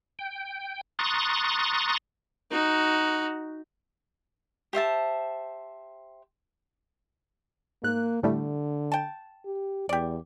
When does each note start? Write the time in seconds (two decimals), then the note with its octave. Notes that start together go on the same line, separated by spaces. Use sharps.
0.19 G5
0.99 A#5 C6 C#6 D#6 F#6 A6
2.51 D#4 F#4
4.73 G4 C5 E5 A5
7.83 G#2 A#3 F#6
8.23 A2 D3 G3 A3
8.92 G5 A5
9.46 G4
9.89 E2 G4 D5